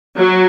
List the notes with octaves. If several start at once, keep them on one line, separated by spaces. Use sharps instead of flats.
F#3